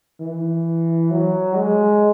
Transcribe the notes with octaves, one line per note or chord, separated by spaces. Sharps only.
E3
F#3
G#3